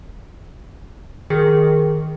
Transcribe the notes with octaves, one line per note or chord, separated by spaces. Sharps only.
D#3 G#4